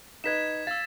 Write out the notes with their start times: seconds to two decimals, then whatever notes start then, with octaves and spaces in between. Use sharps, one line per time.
0.24 D#4 B4 D#5 G#6 B6 E7
0.67 F5 E6 A6